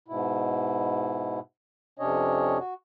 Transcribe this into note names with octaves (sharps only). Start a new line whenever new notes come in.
G#2 B2 E4
F2 C3 C#4 D4 C#5 D#5
F#4